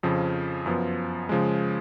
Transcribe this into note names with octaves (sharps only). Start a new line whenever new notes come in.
F2 C#3 F3
F#2 F3 B3
C#3 F3 G#3